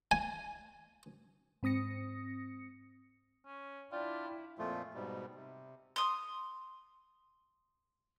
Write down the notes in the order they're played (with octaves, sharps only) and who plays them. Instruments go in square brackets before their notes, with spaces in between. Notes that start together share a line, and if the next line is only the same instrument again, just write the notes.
[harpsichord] G#5
[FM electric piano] G#2 C4 D#6 A#6 C#7
[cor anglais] C#4
[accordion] D4 D5 G5 [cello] E4 [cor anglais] F4
[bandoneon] F2 A#2 F3 A3 F4
G#2 B2 G3
C3
[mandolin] C6 D#6